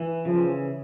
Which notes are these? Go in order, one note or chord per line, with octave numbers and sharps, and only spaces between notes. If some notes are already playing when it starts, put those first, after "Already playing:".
Already playing: E3
C#3 F3